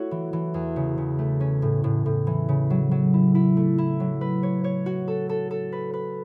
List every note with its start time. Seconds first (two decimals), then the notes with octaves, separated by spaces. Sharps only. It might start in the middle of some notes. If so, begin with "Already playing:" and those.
Already playing: A3 E4 F#4 C#5
0.11 E3
0.33 E3
0.54 E2
0.76 C#3
0.98 C#3
1.19 A3
1.40 C#4
1.62 A2
1.84 A2
2.06 A2
2.27 E3
2.49 C#3
2.70 F#3
2.91 F#3
3.14 E4
3.35 E4
3.57 A3
3.78 E4
4.00 F#3
4.21 B4
4.43 C#5
4.64 C#5
4.86 F#4
5.08 A4
5.29 A4
5.51 A4
5.72 B4
5.94 B4